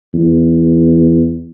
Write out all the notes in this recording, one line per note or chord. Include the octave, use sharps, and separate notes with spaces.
E2